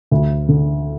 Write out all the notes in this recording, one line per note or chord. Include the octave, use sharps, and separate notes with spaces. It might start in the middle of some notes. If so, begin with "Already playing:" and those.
D2
D3